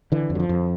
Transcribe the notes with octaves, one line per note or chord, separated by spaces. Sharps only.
D3 E3
F2
F#3
F3
F2